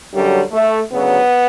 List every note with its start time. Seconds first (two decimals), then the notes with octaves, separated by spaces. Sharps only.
0.12 F#2 D3 F#3 G3
0.51 A3
0.91 D2 C#3 F#3 B3